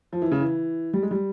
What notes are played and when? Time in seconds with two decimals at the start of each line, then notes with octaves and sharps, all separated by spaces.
0.13 F3
0.22 E3
0.32 C#3
0.40 E3
0.94 G3
1.03 G#3
1.11 G3